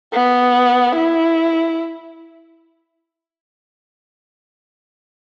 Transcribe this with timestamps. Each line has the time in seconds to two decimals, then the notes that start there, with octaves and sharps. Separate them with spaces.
0.13 B3
0.95 E4